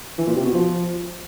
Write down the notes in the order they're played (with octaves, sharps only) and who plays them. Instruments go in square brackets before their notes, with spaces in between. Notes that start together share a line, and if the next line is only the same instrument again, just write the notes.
[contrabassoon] E3
A#2
C3
B2
F3